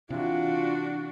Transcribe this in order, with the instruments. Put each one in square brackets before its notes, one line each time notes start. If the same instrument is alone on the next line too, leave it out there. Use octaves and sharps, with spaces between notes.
[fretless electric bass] C3 E3 [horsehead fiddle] D4 F#4 [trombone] F4